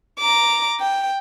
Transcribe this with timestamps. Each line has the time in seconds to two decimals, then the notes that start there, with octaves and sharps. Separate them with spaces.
0.20 A#5 D6
0.80 G5